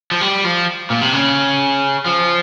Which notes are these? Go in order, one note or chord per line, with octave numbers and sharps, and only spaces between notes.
F3
G3
F3
A#2
C3
C#3
F3